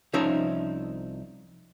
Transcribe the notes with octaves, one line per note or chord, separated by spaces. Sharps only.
C2 F3 C#4 D#4 E5 A5